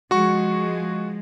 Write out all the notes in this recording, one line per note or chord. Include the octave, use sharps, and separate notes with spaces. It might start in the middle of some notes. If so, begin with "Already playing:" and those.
F3 G#3 F#4 C#6